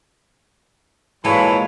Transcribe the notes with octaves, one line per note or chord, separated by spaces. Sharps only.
A#2 E3 F#3 G#3 A#3 A4 C#5 B5